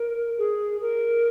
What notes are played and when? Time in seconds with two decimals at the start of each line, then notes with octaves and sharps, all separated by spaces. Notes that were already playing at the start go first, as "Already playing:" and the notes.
Already playing: A#4
0.38 G#4
0.81 A#4